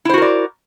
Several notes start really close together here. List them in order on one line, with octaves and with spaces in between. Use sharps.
E4 C5 F#4 A#4 D5